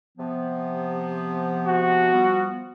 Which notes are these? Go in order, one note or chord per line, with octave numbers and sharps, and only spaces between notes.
C3 F3 B3
F#4
F3 G3 B3